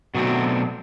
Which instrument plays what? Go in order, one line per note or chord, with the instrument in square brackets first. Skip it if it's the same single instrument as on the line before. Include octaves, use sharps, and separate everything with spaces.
[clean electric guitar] B2 F#3 A3 C4 D4